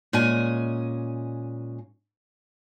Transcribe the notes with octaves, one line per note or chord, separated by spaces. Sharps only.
A#2 G#3 C#4 D#5 G#5